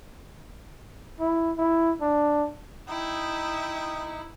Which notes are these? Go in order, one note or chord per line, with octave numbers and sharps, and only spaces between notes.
E4
E4
D4
D#4 E4 E5 G5 D#6